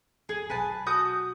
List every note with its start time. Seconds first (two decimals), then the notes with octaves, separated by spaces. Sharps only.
0.29 E2 G#4
0.50 B1 B4 G#5 A5
0.87 F#4 D#6 G6